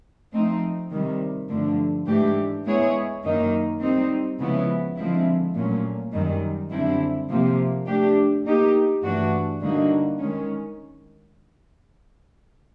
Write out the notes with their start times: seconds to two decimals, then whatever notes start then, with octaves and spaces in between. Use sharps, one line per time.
0.32 F3 A3 C4 D#4
0.91 C3 D#3 G3
1.49 G2 D3 F3 A3
2.06 G#2 E3 A3 D4 G4
2.65 G#3 B3 E4 G#4 C#5
3.23 F#2 D#3 F#3 A#3 D#4
3.81 G3 C4 D#4
4.38 C#3 F3 G#3 B3 E4
4.97 D3 F3 G#3 C4 E4
5.54 A#2 F#3 A3 C#4
6.13 F#2 D#3 G3
6.70 F#2 D3 G3 C4 E4
7.29 C3 F3 A#3
7.87 A3 D4 G4
8.45 A#3 D#4 G4
9.02 G2 E3 A3 D4 F#4
9.61 D3 G3 A#3 D#4 F#4
10.19 D#3 G#3 C#4